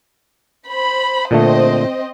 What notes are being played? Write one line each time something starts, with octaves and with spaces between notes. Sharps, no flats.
C5 B5
A#2 D3 A3 C4 C5 D#5